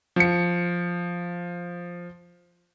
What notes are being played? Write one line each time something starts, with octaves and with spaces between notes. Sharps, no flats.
F3 C#7